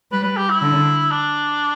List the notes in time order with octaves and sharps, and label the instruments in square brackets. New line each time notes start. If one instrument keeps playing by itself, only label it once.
[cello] G3 [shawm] B4
[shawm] B4
G4
E4
[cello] D3
[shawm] D4